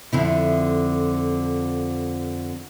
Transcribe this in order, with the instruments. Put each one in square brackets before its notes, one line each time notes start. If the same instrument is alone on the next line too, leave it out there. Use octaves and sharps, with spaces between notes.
[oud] F2 D3 E4